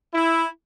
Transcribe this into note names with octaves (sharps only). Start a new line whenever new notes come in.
E4